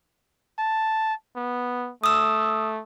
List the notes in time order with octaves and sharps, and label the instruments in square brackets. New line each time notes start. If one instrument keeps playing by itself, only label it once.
[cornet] A5
B3
[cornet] A3 [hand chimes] D#6 E6